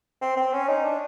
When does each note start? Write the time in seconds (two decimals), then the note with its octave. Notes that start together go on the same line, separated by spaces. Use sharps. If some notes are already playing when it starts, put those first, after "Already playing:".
0.21 C4
0.37 C4
0.53 C#4
0.68 D#4
0.85 D4